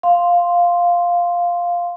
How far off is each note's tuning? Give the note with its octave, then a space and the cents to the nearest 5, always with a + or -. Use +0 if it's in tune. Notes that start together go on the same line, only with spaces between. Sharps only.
F5 +0 C6 +0